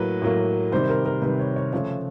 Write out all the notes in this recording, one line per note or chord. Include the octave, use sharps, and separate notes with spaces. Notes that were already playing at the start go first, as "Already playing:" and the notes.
Already playing: A2 F#3 A#3 B4
A2 F#3 A#3
C3 D#3 G3 C5
A#4
A#4
C3 D#3 G3 B4
C#5
C#5
C#3 F3 A3 C#5